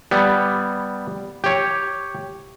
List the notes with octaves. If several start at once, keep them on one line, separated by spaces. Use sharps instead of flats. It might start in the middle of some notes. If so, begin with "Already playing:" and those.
G3 B3
G4 C#5